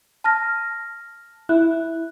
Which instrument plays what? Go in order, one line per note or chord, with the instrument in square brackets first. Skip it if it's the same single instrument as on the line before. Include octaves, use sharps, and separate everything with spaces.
[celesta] A5 F6 A#6
[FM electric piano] E4 [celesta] F#6